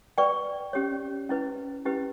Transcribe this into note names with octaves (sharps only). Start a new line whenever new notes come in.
B4 D5 G5 C#6
C#4 G4 C#5
C#4 E4 B4
C#4 E4 G4 B4